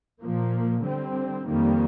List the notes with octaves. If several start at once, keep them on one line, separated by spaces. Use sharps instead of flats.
A#2 F3 A#3
D3 G3 C4
F2 D#3 G3 A#3